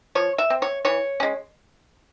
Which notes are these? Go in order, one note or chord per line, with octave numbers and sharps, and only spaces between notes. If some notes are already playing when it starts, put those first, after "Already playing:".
F3 C#5
E5
C4
C#5
E3 C#5
G#3 C#4